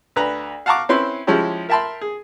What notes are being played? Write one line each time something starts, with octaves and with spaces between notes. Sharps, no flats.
D2 B4 A#5
F5 F#5 A5 A#5 C#6 D6
C4 C#4 E4 B4 C6
C#3 F3 G#3 C#4 E4 G4
A#4 E5 G5 A5 B5 C6
G#4